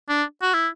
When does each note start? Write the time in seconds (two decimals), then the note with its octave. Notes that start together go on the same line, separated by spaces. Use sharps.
0.09 D4
0.42 F#4
0.54 E4